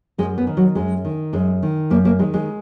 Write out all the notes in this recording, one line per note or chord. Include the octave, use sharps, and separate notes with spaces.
F#2 G#3
B3
D#3
F#3
F#2 G#3
D#3
F#2 G#3
D#3
F#2 A#3
A#3
D#3 G#3
G#3